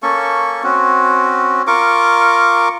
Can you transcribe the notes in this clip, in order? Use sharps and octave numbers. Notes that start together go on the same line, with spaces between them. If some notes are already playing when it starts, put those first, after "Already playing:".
A#3 C#4 A4 C#6
C4 C#4 F#4
F4 A#4 C#6 D6